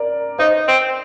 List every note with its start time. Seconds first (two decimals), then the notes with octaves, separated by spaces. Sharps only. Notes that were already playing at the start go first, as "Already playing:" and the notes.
Already playing: A#4 D5
0.39 D#4 C5 D#5
0.68 C4